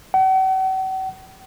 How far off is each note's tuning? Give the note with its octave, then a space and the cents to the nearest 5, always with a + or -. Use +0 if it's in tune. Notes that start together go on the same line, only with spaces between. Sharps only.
F#5 +45